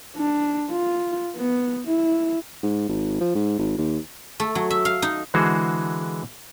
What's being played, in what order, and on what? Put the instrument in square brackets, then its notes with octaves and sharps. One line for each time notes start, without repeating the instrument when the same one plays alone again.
[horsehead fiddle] D4
F4
B3
E4
[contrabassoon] G#2
G#1
F3
G#2
G#1
D#2
[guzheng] A3
F#3
E5
F5
D#4
[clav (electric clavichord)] D3 E3 G#3 F#4 G#4 C5